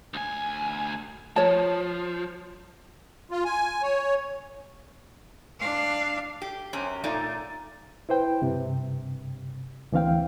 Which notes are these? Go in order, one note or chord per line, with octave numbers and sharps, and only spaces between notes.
D2 G#5
F3 C#5 A5
F4
G#5
C#5
D4 F5
G4
F#2 C3 C4 C#4
A#2 A3 A#3 D#4 D5
E4 B4 C5 G5
G2 C3
D2 E3 C4 F5 G5